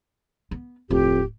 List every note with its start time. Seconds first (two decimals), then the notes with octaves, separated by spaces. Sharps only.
0.51 B3
0.90 D1 F2 A2 G4